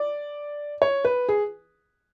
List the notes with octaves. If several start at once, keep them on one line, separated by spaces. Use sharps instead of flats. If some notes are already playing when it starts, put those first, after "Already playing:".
Already playing: D5
C#5
B4
G#4